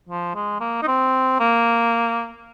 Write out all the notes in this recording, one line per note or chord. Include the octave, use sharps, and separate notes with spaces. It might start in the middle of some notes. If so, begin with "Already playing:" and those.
F3
G#3
A#3
D#4
C4
A#3